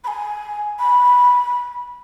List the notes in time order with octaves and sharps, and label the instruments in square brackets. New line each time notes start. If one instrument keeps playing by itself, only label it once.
[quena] B5
G#5
B5